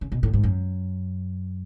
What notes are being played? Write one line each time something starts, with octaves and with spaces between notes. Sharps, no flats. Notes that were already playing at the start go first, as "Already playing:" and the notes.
C#3
B2
A2
G#2
F#2